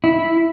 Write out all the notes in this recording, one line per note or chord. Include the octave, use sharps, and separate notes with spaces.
E4